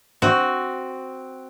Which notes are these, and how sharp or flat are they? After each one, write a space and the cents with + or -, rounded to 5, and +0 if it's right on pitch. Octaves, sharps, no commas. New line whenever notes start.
C4 +0 F#4 +5